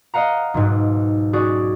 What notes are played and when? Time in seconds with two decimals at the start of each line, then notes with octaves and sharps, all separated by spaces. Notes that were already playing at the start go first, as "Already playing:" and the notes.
0.14 D#5 F5 F#5 A#5
0.54 B1 G#2
1.33 C#4 F#4 G#4 D5